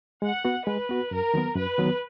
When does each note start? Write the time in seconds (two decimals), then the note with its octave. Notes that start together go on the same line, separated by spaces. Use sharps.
0.22 G#3 F#5
0.45 B3 F#4
0.66 G#3 B4
0.89 B3 F#4
1.11 F#2 A#4
1.34 D#3 F#3 B3
1.56 F#2 B4
1.78 D#3 F#3 B3